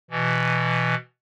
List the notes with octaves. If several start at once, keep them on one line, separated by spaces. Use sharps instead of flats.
B2 E3